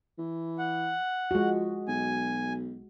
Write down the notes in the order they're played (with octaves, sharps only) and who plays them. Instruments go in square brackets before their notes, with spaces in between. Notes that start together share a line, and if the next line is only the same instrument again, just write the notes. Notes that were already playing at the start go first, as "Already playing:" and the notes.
[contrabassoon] E3
[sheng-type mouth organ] F#5
[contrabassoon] F3 [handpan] G#3 F#4
[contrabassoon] B1 [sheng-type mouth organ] G#5